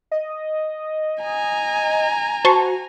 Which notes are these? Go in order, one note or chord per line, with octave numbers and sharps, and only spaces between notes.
D#5
G#5 A#5
F#4 C5 A5 C#6